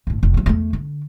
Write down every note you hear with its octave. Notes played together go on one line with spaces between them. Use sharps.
G1 A2
F1
D2 F#3
E2 A3
D3